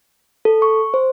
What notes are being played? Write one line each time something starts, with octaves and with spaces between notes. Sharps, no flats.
A4
C#6
C5